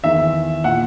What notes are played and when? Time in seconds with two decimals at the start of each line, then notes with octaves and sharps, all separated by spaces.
0.04 E2 D#3 E5
0.64 A#2 F#5